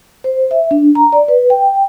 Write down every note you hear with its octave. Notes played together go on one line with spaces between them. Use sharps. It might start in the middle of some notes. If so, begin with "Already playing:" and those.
C5
E5
D4
A#5
D5
B4
G5